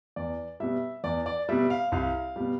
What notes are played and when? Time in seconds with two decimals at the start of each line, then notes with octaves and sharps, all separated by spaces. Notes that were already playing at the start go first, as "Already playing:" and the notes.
0.16 E2 D5
0.60 B2 G3 E5
1.04 E2 D5
1.26 D5
1.49 B2 G3 E5
1.70 F5
1.92 C2 F5
2.36 B2 G3